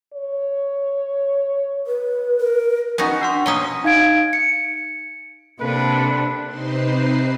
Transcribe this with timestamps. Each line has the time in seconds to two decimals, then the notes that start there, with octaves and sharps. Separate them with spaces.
0.13 C#5
1.87 B4
2.40 A#4
2.98 B3 C#4 D#4 F#4 G#5
3.21 D4 F#5 C6
3.46 B2 A#3 C#4 C#5 A#5 D#6
3.84 D#4 F5 G#6 D7
4.33 C#7
5.60 C3 A#3 D4 A4 B4
6.46 C3 C4 D#4 B4 C5 C6